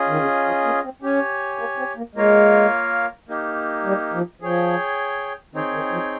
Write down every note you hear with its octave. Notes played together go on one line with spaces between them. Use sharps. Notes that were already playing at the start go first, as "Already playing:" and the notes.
Already playing: C#4 F4 G#4 D#5
D#3
C#3
F3
A#3
C4
C#4 G4 C#5 G#5
A#3
C4
A#3
G#3 A#3 F4 A#4 C#5 F5
A#3 D#4 G4
G3
F3
F3 G#4 C#5 G5
D#3 C4 D#4 G#4 C#5 G5
D#3
F3